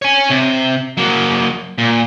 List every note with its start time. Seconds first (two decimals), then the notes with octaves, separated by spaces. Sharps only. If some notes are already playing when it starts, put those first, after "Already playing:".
0.02 C#5 G#5
0.30 C3
0.97 F#3 A#3
1.78 A#2